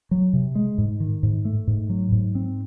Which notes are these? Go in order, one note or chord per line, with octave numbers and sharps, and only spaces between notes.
F#3
C3
G#3
G#2
D#3
G#2
A3
G#2
F#3
G#2
C4